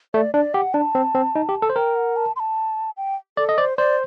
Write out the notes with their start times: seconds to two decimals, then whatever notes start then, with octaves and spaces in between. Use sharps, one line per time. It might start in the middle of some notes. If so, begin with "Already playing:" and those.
0.14 A3 D5
0.34 D4 D5
0.54 G4 F#5
0.74 D4 A5
0.95 C4
1.15 C4
1.36 D#4
1.49 G4
1.62 A4
1.70 C5
1.76 A#4 G5
1.96 F#5
2.16 A5
2.36 C6
2.40 A5
2.97 G5
3.37 A4 D5
3.49 D#5
3.58 C5 D5
3.77 C5 D5